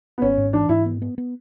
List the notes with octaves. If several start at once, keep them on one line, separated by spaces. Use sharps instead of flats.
B3
G#1 C#4
G#2
E3 D4
G#2 E4
B3
B3
B3